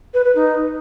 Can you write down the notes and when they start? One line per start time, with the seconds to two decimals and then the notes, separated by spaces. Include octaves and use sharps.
0.14 B4
0.25 B4
0.35 D#4